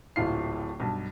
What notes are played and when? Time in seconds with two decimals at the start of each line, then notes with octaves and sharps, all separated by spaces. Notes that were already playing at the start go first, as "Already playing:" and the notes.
0.16 D1 A#1 A2 F4 C7
0.80 B1 G2